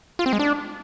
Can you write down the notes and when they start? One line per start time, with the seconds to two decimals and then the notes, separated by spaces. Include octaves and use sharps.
0.19 F4
0.26 C4
0.33 G#3
0.39 D4